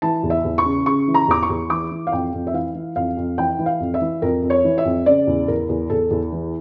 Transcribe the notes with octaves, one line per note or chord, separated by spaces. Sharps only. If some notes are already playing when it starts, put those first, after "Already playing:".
E3 A5
E2
E5
E2
C#6
C#3
C#3 C#6
E3
A#5
E2 D6
C#6
E2
E3 D6
E3
F5
F2 G5
F2
E5
E3 F5
E3
F2 F5
F2
E3 G5
E3
F5
F2
E5
E3
F2 A#4
F2
C#5
E3
E5
F2
C#3 D5
E2
E2 A#4
E2
E2 A4
E2
E3